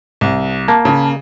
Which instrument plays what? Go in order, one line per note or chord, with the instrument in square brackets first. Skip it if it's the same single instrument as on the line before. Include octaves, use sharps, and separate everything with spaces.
[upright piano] C2
[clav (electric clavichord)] A#3 [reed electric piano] A5
[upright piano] C#3